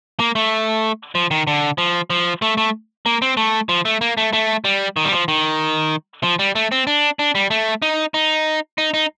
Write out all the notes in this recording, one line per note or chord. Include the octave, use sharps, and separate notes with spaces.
A#3
A3
F3
D#3
D3
F3
F3
A3
A3
A#3
C4
A3
F3
A3
A#3
A3
A3
G3
D#3
G3
F3
D#3
F3
G3
A3
C4
D4
D4
G3
A3
D#4
D#4
D#4
D#4